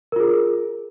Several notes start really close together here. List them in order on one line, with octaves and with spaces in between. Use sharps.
A#4 F4 G#4